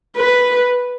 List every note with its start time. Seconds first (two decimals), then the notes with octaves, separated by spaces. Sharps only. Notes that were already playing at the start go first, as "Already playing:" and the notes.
0.17 B4